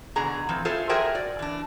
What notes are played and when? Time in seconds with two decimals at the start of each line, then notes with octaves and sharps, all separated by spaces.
0.16 B2 D3 G#4 A#5
0.49 E3 F3 C4
0.65 F4 G#4 A4 C5 E5
0.89 F#4 G#4 A#4 C5 E5 G5
1.15 D5
1.39 E3 D4